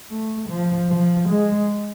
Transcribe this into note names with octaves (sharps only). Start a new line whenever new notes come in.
A3
F3
F3
G#3